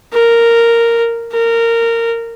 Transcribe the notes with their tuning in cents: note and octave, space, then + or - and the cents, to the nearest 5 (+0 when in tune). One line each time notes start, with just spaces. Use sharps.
A#4 -5
A#4 -15